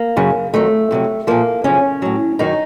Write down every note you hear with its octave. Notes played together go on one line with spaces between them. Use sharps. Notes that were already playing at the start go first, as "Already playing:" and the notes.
Already playing: A#3
F#2 C#3 F#3
F2 D#3 F#3 A3
F2 C3 F#3
A#2 F3 A#3
F#2 C#3 F3 C#4
A2 F#3
F#2 D#3 F#3 D#4